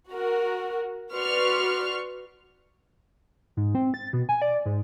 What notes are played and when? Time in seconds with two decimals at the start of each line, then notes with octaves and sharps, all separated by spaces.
0.10 F#4 A#4
1.14 F#4 B4 D5 C6 C#6 F6
3.57 G#2
3.75 C4
3.94 A6
4.13 B2
4.29 G#5
4.42 D5
4.66 G#2